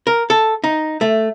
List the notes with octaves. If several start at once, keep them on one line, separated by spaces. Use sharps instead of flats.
A#4
A4
D#4
A3